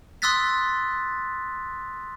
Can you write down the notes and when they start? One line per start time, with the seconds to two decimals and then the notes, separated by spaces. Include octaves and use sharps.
0.22 C6 D#6 E6 F#6 A6 B6